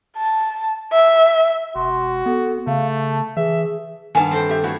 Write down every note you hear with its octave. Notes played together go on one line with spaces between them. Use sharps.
A5
E5
E1 F#4 C6
B3 A4
C#3 A3 F5
A5
E3 G#4 E5
G2 D#3 B3 G#5 A5
C4 A4 C5
G4 E5
A3 E4 F#4 C#5